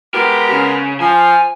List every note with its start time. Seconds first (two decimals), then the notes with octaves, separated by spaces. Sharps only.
0.14 G#3 B3 G4 A#4
0.52 C#3
1.00 F3 G#5